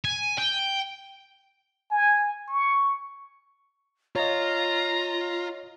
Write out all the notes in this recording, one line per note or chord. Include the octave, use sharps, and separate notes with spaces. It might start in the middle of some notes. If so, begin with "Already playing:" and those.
G#5
G5
G#5
C#6
F4 C#5 D#5 A#5